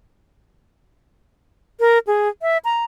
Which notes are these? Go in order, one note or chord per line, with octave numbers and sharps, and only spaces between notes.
A#4
G#4
E5
A#5